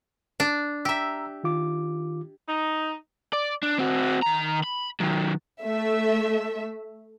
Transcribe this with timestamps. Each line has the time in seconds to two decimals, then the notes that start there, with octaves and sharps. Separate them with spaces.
0.40 D4
0.85 G4 E5 A#5 E6
1.44 D#3 F4 D6
2.49 D#4
3.33 D5
3.63 D4
3.79 C4 F#4
4.22 D#3 A#5
4.63 B5
5.00 D#3 F#3
5.64 A3 E5